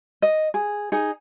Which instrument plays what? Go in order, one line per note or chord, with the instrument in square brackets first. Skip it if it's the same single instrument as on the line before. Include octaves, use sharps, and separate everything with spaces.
[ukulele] D#5
G#4
D#4 G#4